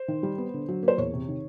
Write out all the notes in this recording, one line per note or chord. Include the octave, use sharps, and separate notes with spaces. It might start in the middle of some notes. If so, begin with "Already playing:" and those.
Already playing: C5
D#3
G3
B3
D3
F#3
A#3
C5
E2 C#5
C3
D#3